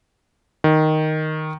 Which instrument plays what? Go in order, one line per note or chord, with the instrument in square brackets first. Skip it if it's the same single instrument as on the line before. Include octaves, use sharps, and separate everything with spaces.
[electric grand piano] D#3